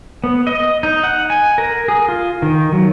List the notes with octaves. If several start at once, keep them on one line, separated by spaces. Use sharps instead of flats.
B3
D#5
D#4
F#5
G#5
A#4
G#4
F4
D#3
F#3